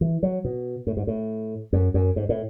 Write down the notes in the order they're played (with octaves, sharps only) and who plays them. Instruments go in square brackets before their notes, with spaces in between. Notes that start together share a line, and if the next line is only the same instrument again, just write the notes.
[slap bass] E3
F#3
B2
A2
G#2
A2
F#2
F#2
G#2
A2